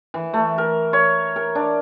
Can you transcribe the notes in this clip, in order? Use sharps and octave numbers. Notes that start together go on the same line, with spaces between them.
E3
A3
A#4
C#5
A#4
D4